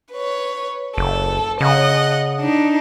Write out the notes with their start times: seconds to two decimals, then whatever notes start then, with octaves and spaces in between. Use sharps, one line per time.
0.14 B4 C#5
0.98 F#1 A4
1.61 C#3 D#5 F#5
2.41 D4 D#4